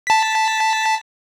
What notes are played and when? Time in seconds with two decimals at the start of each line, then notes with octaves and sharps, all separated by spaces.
0.07 A5 B6